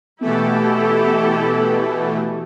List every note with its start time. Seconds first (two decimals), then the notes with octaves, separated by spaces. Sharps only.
0.22 B2 E3 A3 B3 E4 G4 A4